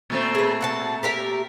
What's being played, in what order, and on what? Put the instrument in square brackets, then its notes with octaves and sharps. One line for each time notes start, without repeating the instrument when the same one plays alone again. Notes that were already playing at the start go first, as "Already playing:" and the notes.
[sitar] A#2 A3 C4
[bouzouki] G#4 B4
F#4 F#5 A5
G4 A#4 E5